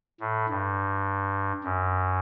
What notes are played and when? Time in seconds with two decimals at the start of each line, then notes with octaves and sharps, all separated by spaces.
0.20 A2
0.49 G2
1.64 F#2